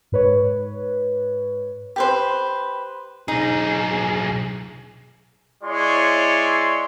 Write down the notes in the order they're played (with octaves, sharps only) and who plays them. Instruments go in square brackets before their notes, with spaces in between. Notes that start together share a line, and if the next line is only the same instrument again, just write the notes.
[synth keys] G#2 B4 C#5
[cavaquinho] G4 B4 C5
[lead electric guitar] B1 G#4 [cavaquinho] D#4
[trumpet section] G#3 E4 C#5 D5 C6